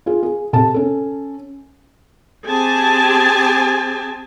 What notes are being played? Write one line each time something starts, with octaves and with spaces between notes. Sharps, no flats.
F4 G#4
G#4
C3 A4 A5
C#4 A4
C4 G4 G#4 G#5 A5